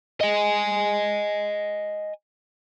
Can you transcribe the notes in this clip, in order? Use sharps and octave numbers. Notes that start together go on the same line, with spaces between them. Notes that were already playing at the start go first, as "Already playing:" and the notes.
D#5 G#5